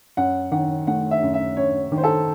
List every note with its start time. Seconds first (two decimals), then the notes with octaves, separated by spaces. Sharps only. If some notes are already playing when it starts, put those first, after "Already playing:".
0.17 F#2 F#5
0.52 D#3 F#5
0.87 A3 F#5
1.11 E5
1.23 F#2
1.34 E5
1.57 F#2 C#5
1.92 D#3
1.97 C5
2.04 A4